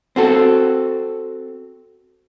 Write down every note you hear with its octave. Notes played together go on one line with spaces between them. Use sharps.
C4 F#4 A4